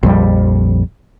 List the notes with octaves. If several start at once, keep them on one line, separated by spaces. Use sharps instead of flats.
A#1 F2 G3